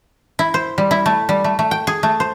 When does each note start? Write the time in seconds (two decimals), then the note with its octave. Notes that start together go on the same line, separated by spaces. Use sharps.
0.39 E4
0.54 C5
0.78 G3
0.91 E4
1.06 A3
1.29 G3
1.44 A3
1.59 A3
1.71 G5
1.87 G#4
2.03 A3
2.20 C5